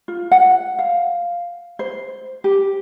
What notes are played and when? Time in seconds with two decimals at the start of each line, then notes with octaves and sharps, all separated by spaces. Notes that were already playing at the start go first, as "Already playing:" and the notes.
0.08 F4
0.31 F#5
0.79 F5
1.79 C5
2.44 G4